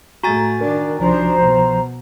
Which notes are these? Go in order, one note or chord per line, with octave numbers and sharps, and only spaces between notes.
A2 A3 F#4 G#5 A#5 A6
D#3 D4 A#4
C2 F3 D4 D#4 C5 A#5
B2